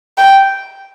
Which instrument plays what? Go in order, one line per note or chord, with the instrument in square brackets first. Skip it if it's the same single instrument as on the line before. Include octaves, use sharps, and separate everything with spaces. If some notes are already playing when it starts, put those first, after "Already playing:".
[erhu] G5